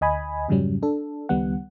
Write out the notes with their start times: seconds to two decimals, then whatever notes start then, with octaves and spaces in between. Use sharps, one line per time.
0.01 D2 D#5 G#5 B5
0.49 F2 G#2 C#3 F#3 G3 C#4
0.83 D4 A4
1.29 C#2 D#3 G3 B3 F#5